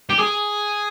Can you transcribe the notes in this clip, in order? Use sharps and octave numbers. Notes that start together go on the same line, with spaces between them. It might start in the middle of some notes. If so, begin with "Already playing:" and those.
G4
G#4